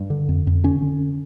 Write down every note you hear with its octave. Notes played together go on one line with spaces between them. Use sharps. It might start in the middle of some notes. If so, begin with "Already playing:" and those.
Already playing: G2
D3
F2
F2
D3 C#4
D3